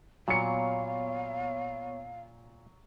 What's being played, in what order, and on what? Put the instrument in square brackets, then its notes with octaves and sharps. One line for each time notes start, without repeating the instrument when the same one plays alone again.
[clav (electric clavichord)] A#2 [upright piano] F#3 C#7 [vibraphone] B3 C#5 C#6 [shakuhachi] F5